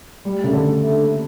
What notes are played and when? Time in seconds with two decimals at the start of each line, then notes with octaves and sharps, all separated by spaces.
0.24 G3 A3
0.43 C#3 D4 A4 E5
0.53 D3
0.62 A3
0.81 D4 A4 E5
1.01 A#3